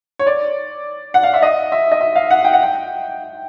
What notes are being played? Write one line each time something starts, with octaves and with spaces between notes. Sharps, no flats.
C#5
D5
F#5
F5
E5
D#5
E5
D#5
E5
F5
F#5
G5
F#5
G5